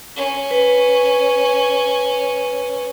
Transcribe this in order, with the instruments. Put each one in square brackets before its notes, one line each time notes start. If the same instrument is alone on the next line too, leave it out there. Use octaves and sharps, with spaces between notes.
[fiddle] C#4
[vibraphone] B4